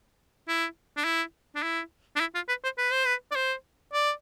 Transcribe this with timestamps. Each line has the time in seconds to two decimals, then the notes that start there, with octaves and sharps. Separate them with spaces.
0.48 E4
0.97 D4
1.05 E4
1.55 D4
1.63 E4
2.16 D4
2.20 E4
2.35 F4
2.49 B4
2.64 C5
2.78 B4
2.92 C5
3.05 B4
3.31 D5
3.35 C5
3.93 D5